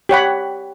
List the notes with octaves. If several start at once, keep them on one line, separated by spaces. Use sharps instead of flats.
G4 C#5 F#5 B5